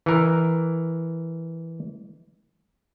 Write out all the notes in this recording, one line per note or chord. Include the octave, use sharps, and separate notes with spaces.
E3 A#4